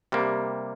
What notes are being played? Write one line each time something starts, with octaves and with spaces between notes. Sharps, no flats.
C3 G3 A#3